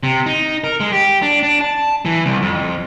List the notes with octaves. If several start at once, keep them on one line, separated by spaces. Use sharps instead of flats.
C3
D#4
A#4
G#3
G4
D4
D4
A5
E3
C2
F2